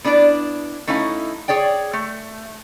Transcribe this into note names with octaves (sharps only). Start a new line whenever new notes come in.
B3 D4 E4 D5
A3 C#4 D#4 E4 F5
G#4 C#5 D5 G5
A3